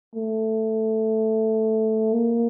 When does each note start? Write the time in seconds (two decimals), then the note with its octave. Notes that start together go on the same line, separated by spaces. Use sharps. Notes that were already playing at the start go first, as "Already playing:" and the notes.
0.15 A3
2.13 A#3